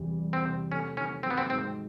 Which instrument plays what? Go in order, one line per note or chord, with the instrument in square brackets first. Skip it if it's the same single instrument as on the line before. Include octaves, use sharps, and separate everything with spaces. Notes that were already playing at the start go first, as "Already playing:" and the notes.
Already playing: [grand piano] E2 C3 E3 G3
G3
[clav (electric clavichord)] C4
[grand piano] C3
[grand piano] A3 [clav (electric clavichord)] C#4
[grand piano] D#3 [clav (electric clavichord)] C#4
[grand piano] F#3 [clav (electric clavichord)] C4
[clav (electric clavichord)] B3
C4
[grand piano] G#2 [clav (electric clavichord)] C4